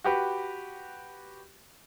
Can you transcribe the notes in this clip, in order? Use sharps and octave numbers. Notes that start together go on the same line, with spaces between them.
F#4 G4 B4